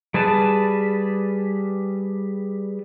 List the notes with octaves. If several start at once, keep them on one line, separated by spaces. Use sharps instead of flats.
G3 G#4 B4 A5